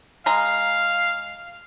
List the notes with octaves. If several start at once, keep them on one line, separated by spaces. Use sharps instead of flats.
G#3 F5 A#5